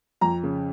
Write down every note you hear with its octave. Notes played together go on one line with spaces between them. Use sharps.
F2 A#5
C#3